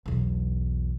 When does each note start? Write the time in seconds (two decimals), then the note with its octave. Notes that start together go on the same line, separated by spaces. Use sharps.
0.06 B1 E2